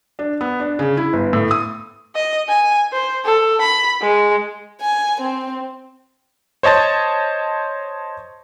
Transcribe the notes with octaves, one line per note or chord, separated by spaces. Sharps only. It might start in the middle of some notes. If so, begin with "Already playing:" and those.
D4
B3
D4
C#3
E4
G1
A2
D#6
D#5
G#5
C5
A4
B5
G#3
G#5
C4
C5 C#5 D#5 A5 A6